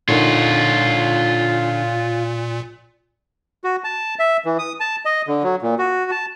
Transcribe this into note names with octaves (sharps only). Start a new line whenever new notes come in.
A#2 D3 A#3 D#4 F4 C#5
F#4
A5
E5
E3
D#6
A5
D#5
D3
F#3
A#2
F#4
A5